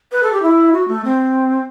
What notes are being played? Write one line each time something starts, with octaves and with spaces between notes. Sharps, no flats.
B4
A4
G4
E4
F#4
A3
C4